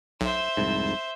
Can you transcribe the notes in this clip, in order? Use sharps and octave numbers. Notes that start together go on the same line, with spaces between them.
B1 C5 E5
F1 C2 G#2